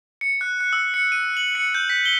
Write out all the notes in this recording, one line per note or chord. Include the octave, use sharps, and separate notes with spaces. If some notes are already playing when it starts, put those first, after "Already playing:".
C#7
F#6
F#6
E6
C#7
D#7
F#7
C#7
G6
B6
G7